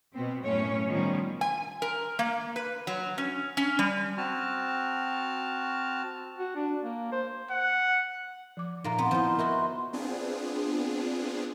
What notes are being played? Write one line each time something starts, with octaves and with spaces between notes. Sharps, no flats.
B2 B3 C4
F#2 A2 A3 C#4 C#5
B2 D#3 F3 G3 C#4
G#5
A#4
A#3
B4
F#3
C#4
C#4
G3
C4 F#4 A5 F6
F#4
D4
A#3
C5
F#5
F3 D6
A#2 A#3 D#4 F5 A#5
B3 C4 C6
F3 C4 D#4 E4 F#5
D#4 E4 F#4 A#4 E5 C#6
B3 C4 D4 F4 G#4